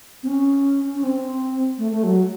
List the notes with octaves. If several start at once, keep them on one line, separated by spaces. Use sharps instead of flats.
C4
C#4
C#4
C4
A3
A3
F#3